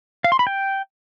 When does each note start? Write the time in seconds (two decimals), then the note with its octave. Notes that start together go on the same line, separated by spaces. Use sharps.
0.24 F5
0.32 C6
0.39 B5
0.47 G5